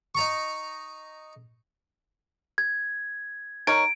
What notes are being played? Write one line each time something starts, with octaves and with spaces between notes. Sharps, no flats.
D#4 A#5 C#6
G#6
D#4 A#4 C#5 D7